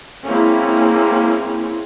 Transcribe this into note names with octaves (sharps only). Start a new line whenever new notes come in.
G#3 A#3 C4 C#4 E4